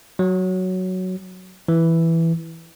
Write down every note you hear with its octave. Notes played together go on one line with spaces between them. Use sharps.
F#3
E3